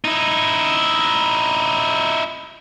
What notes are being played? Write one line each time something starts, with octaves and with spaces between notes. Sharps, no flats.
D#4 E4